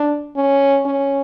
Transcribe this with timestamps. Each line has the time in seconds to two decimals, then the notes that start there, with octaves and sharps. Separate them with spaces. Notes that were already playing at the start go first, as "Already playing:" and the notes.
Already playing: D4
0.36 C#4
0.85 C#4